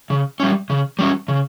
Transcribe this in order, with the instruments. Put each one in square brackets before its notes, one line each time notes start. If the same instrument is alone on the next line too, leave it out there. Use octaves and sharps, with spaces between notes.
[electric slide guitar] C#3
G3 C#4
C#3
G3 C#4
C#3